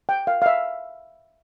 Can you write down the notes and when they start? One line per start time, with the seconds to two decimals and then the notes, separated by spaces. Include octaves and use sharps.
0.09 G5
0.27 F5
0.42 F5
0.46 E5